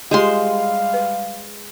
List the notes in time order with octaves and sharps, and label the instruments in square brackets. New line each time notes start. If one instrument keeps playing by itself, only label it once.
[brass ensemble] G3 F5 [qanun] G#3 C5 C6 [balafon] F4 G4
[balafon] B4